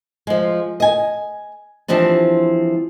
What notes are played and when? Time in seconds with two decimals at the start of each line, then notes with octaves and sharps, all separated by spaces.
0.27 F3 G#3
0.80 D#5 G#5
1.88 E3 F3 G3 C4 D4